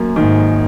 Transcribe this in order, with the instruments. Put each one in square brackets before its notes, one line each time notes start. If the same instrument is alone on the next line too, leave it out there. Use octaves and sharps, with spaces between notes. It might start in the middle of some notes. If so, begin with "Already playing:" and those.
Already playing: [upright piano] F#2 F#3 A#3
[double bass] G#2 [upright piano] D#3